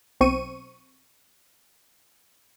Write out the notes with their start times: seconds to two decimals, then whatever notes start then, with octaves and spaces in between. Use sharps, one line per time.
0.21 B1 C4 C#6 D#7